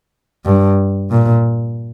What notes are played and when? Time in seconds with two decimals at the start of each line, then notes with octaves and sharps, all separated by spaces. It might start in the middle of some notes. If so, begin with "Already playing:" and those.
0.45 G2
1.11 A#2